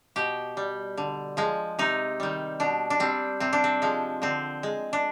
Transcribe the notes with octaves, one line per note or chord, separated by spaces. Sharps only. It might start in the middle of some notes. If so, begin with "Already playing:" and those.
B2 G4
G3
D3
F3 G#3
C3 D#4
D#3 G3
B2 D4
D4
G3 C4
C3 C4
D4
C4
F3 G#3
D3 C4
G#3
D4